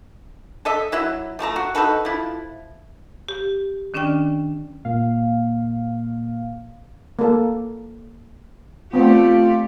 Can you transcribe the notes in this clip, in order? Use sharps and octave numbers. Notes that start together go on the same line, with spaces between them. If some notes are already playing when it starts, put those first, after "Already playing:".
A4 D#5 E5
F#3 E4 E5
F3 A3 A5 A#5
F#4
D#4 F#4 A4 B4
F3 E4
G4
D#3 C#4 D4 D5 G5 F6
A#2 A#3 F5
A#3 A4
A3 B3 C4 F4 G4 D5